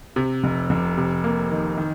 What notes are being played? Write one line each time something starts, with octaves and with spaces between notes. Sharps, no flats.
C3
F1
F1
C3
A#3
D#3
D#3